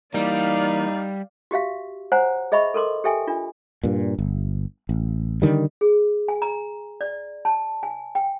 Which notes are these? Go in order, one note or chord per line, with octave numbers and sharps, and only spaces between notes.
E3 G3 A#3 D#4 D5 F5
F#4 G4 E5 F5
C5 C#5 F#5 G#5 A#5
G#4 D#5 E5 B5 C#6
A4 A#4 C6 D6
G4 A4 E5 G5 G#5
D4 F4
G2 A#2
G1
A1
D3 D#3 G3
G#4
G#5
A#5
D5
A5
G#5
G5